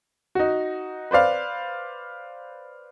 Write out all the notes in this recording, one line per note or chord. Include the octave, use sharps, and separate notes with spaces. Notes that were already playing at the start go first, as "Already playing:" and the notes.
D#4 F#4
B4 C5 D5 F5